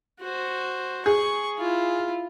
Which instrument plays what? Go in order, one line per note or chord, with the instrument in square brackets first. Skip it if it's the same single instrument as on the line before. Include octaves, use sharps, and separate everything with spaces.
[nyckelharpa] F#4 C5
[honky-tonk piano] G#4 [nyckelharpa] C#6
[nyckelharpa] E4 F4